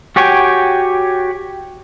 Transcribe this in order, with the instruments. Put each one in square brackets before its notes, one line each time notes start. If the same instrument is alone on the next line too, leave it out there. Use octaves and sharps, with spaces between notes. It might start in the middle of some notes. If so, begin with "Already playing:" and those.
[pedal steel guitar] F#4 G4 C#5 G5 G#5